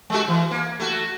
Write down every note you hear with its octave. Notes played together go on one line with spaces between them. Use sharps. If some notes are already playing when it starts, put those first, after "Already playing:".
G#3 A3 F#4
E3
A#3
A3 F#4